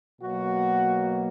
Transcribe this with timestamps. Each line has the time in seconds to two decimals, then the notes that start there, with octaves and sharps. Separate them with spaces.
0.22 B2 F#3 A#3 F#4